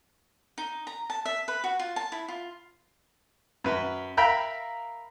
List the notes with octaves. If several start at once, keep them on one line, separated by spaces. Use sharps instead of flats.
D#4
A#5
A5
E5
B4
F#4
F4
A5
E4
F4
F#2 B4
A#4 E5 F5 G5 A#5 B5